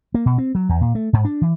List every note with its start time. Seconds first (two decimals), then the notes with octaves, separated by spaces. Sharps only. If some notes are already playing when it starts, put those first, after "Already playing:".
0.14 A#3
0.26 B2
0.38 C4
0.55 F#3
0.69 E2
0.81 A#2
0.95 A3
1.13 G#2
1.25 D4
1.41 E3